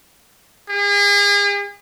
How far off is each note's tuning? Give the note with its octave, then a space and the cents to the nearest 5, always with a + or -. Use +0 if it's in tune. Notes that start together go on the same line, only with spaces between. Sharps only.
G#4 -40